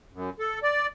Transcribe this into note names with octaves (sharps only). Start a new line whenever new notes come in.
F#2
A4
D5